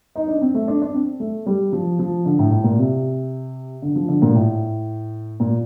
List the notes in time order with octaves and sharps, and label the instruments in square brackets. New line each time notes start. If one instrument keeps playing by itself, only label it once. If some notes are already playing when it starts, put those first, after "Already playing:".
[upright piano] D#4
D4
C4
A3
D4
D4
C4
A3
G3
F3
F3
D3
A2
A2
A#2
C3
D3
F3
D3
A#2
A2
A#2